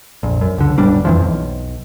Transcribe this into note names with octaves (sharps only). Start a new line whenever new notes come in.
A#1 F2
F#2
C#2 D3
E1 A1 G3 D4
F2 E3 F3
B1